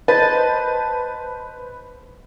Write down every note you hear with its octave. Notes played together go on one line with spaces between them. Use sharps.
B4 C5 D#5 A5